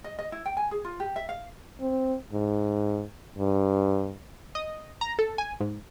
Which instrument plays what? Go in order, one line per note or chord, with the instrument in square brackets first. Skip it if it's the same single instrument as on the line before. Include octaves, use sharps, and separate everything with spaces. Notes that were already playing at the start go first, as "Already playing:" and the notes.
[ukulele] D#5
D#5
E4
G5
G#5
G#4
F4
G4
E5
F5
[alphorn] C4
G#2
G2
[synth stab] D#5
A#5
A4
G#5
G#2